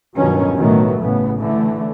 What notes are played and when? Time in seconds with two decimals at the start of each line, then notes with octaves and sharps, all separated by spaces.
0.16 G1 D#2 B2 D#3 F#3 C#4
0.55 A1 B2 D#3 F#3 A3 B3
1.01 A1 A2 C#3 E3 B3
1.38 A2 D3 E3 A3